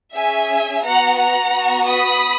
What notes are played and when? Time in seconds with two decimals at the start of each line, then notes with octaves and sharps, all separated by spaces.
0.15 C#4 G#4 E5 G#5
0.84 B3 F#4 F#5 A#5
1.19 F#5 A#5
1.53 B3 F#4
1.87 B5 D#6